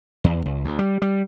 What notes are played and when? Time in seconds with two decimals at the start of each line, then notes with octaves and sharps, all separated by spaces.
0.24 E2
0.46 C#2
0.65 D2
0.79 G3
1.02 G3